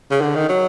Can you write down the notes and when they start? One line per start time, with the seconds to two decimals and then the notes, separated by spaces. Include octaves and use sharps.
0.11 C#3
0.21 D3
0.35 D#3
0.49 F#3